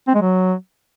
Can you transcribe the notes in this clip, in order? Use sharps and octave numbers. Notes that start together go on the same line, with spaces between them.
C4
G#3
F#3